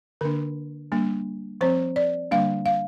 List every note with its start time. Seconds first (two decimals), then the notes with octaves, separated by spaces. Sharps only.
0.21 D3 A#3 D4 A#4
0.92 G3 A#3 D4
1.61 F3 C4 C5
1.96 D5
2.31 D3 G3 A#3 D4 F5
2.66 F5